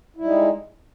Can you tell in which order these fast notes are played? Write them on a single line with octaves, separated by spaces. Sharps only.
E4 G3 D#4 G#3